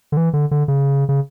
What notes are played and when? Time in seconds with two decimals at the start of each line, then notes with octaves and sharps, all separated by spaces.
0.12 D3
0.17 E3
0.33 D3
0.51 D3
0.68 C#3
1.09 C#3